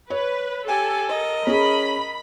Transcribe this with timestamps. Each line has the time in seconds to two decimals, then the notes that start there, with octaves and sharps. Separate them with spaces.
0.10 B4 C#5
0.66 G4 A4 G#5
1.09 A#4 D#5
1.47 C#4 G#4 B5